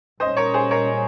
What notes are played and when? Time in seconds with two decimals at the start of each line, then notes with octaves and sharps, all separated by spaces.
0.20 A#2 G3 C#4 C5 D#5
0.37 A#4 C#5
0.54 G#4 C5
0.71 A#4 C#5